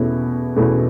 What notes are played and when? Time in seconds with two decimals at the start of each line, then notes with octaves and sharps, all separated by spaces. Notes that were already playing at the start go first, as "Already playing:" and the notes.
Already playing: E2 B2 A3 C#4 E4
0.56 E2 B2 A3 C#4 E4